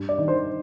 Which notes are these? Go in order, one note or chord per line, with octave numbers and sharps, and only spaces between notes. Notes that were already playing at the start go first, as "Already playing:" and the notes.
Already playing: G2
D5
D#3
C5